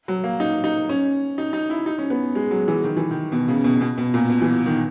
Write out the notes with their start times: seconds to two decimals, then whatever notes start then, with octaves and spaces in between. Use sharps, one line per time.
0.08 F#3
0.24 A#3
0.40 D#4
0.64 D#4
0.89 C#4
1.38 D#4
1.53 D#4
1.70 E4
1.86 D#4
1.98 C#4
2.10 B3
2.35 G#3
2.51 F#3
2.68 E3
2.84 D#3
2.97 E3
3.11 D#3
3.32 B2
3.48 C#3
3.64 B2
3.81 B2
3.98 B2
4.14 A#2
4.30 B2
4.42 E3
4.66 D#3